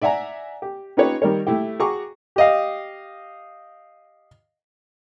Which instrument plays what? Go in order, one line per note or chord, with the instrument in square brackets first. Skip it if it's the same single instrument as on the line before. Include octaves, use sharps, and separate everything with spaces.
[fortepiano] D5 E5 F#5 G#5 A#5
G4
C#4 D#4 F4 G4 B4 C#5
D#3 G3 A#4 C#5
A3 E4 G4
F#4 G#4 G5 A#5 C#6 D6
G4 D#5 F5